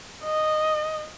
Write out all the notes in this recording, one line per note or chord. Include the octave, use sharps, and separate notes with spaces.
D#5